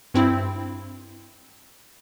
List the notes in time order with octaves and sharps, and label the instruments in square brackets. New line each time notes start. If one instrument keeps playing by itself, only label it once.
[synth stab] G2 C4 E4